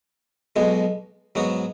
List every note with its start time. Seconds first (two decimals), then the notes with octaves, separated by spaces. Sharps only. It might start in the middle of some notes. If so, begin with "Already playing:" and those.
0.56 B1 B2 G#3
1.35 G#2 F#3 B3 F#4